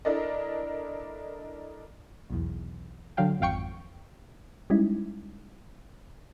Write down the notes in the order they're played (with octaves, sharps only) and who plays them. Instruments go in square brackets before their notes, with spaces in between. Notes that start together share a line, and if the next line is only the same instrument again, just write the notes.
[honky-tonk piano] D4 E4 A4 A#4 D5 D#5
[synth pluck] B1 E2
D3 F#3 F5 G5
G#1 F2 F5 G5 C#6 C#7
[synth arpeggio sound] G3 G#3 C#4 D#4 E4